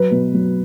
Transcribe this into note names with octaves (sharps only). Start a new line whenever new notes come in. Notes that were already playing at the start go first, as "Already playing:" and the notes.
Already playing: F#3 B4
B2
F#3